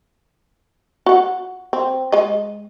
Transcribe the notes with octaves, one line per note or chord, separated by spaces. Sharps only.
F#4 F#5
C4
G#3 D#5